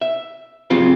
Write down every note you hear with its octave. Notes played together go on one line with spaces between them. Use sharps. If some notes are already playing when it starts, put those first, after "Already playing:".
E5
C#3 F#3 C4 F4 G4